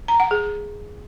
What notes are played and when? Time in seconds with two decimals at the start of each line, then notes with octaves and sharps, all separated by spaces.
0.08 A#5
0.20 F#5
0.31 G#4